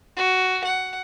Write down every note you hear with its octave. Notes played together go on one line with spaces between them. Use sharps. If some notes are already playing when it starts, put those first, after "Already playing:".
F#4
F#5